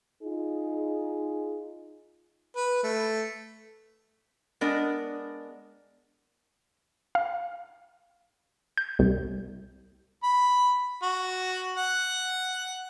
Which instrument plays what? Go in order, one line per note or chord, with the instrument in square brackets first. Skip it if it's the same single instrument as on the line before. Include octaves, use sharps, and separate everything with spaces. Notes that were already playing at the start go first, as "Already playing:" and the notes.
[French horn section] D#4 F4 G#4
[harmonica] B4
A3
[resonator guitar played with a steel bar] G#3 B3 D4 A#4 D5 D#5
[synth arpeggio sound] F5
G6
C2
[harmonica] B5
F#4
F#5